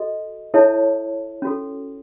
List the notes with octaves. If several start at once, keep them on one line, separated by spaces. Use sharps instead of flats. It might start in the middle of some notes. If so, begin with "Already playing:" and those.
Already playing: F#4 A4 D#5
E4 A4 C#5 E5 A5
C#4 F#4 A4